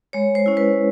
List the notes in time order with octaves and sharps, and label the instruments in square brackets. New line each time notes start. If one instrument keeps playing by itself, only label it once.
[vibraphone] G#3 C#5
C5
C#4 E4
B4